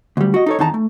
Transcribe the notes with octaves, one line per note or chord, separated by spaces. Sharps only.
D2 G3
F#4 D#5
D#4 A4 C#5
E2 D#3 D#4 A5 A#5
A3